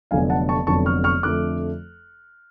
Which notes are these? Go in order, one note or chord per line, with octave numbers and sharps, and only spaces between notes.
F1 F2 D3 F#3 B3 F5 G#5
F#5 A5
A5 C#6
F1 F2 D3 F#3 B3 A5 C#6
C#6 F6
C#6 F6
F2 D3 F3 A3 D6 F#6